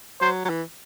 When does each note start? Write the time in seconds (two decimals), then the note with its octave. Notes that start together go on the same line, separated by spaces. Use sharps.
0.20 F#3 C5
0.45 F#3
0.49 E3